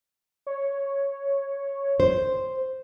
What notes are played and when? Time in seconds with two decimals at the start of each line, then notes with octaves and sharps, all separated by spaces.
0.47 C#5
2.00 C5